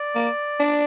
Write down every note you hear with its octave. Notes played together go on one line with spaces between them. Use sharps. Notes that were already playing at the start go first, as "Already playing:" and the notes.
Already playing: D5
A#3
D4